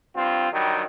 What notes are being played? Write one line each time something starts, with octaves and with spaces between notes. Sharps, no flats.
G2 C4 F4
G2 D#3 F#3 G3